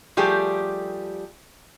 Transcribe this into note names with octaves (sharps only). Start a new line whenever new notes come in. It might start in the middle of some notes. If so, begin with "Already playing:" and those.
F3 G3 A3 G4 G#4